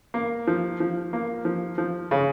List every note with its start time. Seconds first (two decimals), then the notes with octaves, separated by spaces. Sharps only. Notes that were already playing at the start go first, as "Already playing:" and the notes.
0.14 A#3
0.47 F3
0.80 F3
1.13 A#3
1.45 F3
1.78 F3
2.11 C#3